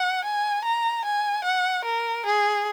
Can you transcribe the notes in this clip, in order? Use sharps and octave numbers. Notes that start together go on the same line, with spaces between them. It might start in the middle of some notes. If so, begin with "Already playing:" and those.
Already playing: F#5
G#5
A#5
G#5
F#5
A#4
G#4